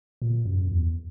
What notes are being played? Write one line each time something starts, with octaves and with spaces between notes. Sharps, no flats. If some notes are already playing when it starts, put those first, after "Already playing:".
A#2
F#2
E2